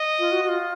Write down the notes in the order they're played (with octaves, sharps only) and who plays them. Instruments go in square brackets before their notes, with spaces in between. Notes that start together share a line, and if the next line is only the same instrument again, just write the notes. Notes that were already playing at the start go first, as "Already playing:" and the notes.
Already playing: [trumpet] D#5
[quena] F4
F#4
F#4
F4